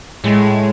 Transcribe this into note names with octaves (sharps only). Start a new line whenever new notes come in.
A2 G#3